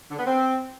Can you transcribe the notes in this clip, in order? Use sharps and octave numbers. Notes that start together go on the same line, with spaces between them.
D3
B3
C4